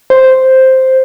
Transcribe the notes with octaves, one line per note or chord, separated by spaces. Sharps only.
C5